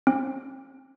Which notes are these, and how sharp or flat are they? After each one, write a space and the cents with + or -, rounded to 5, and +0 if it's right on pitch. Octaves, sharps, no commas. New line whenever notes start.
C4 +35